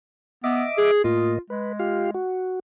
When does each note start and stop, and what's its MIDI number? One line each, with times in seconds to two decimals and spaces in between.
0.44 0.64 59
0.44 0.91 75
0.44 0.91 76
0.44 0.91 86
0.78 1.00 68
1.04 1.38 45
1.04 1.38 58
1.04 1.38 65
1.04 1.38 75
1.50 2.19 56
1.50 1.72 71
1.79 2.10 65
1.79 2.10 67
1.79 2.10 77
2.14 2.59 66